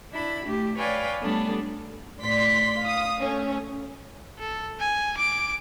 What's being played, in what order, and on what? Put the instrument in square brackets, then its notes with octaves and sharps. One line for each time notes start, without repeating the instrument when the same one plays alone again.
[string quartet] D4 E4 B5
A3 G4
B4 C#5 D5 F5 G5 G#5
G3 A3 B3 D4 A4
[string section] A2 D5 C6 B6
F5 D#6
A3 C#4
[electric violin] A4
G#5
D6 D7